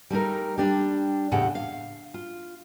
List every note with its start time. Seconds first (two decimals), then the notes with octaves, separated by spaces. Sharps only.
0.10 G3 A3 D#4 A#4
0.58 G3 D4 G4
1.32 E2 A2 C#3 G4 F#5
1.55 F5
2.14 F4